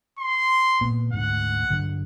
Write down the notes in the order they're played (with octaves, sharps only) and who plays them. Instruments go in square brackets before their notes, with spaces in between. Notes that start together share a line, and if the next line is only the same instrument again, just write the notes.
[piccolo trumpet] C6
[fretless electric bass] A#2 A#3 B3
[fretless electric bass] D2 G#2 [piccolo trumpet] F#5
[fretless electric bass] G2 D3 F#3